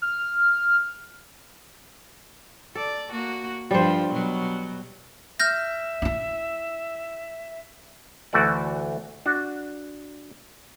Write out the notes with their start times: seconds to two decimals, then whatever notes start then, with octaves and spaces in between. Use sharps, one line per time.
0.02 F6
2.75 A4 D5
3.11 A#3 F#4
3.71 G2 F3 G3 C5
4.12 B2 F#3
5.40 E5 F6 G6 A#6
6.02 D#4 E4
8.33 D2 E3 A3 F#4 D5
9.26 D4 F#4